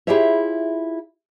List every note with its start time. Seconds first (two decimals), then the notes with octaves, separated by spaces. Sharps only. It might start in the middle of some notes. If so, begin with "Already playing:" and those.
0.07 E4 F4 G4 G#4 C#5 E5